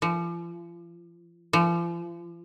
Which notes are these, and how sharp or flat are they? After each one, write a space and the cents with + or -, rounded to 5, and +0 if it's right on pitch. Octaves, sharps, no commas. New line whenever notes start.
F3 -40
F3 -40